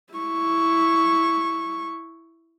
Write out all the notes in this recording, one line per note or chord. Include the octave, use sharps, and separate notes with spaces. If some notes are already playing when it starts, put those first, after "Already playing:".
E4 C#6